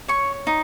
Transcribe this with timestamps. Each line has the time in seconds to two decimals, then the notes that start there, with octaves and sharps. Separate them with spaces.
0.08 C#5 C#6
0.47 D#4